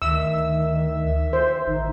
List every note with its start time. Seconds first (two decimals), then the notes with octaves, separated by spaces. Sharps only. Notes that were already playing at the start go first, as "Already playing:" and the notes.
0.02 D2 D#3 E5 E6
1.33 C5
1.67 A1 D#3 D#4